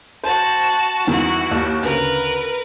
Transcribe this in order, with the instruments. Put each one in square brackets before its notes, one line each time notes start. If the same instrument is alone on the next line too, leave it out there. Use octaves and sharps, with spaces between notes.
[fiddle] F#4 A5 [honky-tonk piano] C5
[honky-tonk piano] E2 D#3 G3 [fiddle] E4 F#4
[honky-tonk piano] D#2
[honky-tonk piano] D2 C#3 [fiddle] A#4 B4